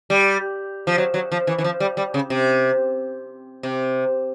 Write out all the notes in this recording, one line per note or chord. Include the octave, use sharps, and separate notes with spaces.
G3
F3
F#3
F#3
F3
E3
E3
F3
G3
G3
C#3
C3
C3